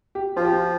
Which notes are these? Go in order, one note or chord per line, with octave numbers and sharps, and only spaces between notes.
G4
F3 F4
G4
F4